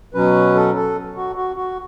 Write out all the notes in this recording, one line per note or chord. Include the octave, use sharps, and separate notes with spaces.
B2 F#3 C#4 B4
A4
A4
F#4
F#4
F#4